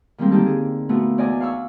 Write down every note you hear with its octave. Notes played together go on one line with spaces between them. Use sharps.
D#3 G3 G#3 A#3 C4
D3 A#3 D4 D#4 G4 A4
G#4
A#2 A3 B3 F#4
E2 D5 D#5 G#5
F5 G#5 B5 C#6 D6 E6